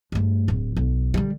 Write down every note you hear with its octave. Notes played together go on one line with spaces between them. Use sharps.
G2 A3
D1
B1
D3 G3